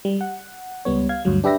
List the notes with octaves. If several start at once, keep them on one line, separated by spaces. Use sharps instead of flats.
G3
F#5
C#2 G3 B3 C#5
F5 G#6
D2 G2 F#3
D4 G4 B4 E5 G5 A#6